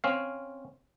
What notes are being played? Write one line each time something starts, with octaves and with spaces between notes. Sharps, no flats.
C4 C#4 F5